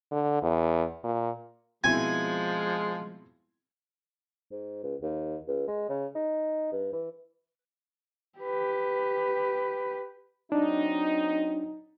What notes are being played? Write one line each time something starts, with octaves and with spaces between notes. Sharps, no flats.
D3
E2
A#2
B2 F3 G#3 C4 E4 G#5
G#2
C#2
D#2
C#2
G#3
C#3
D#4
G2
E3
G4 B4
F#3 C4 D4 D#4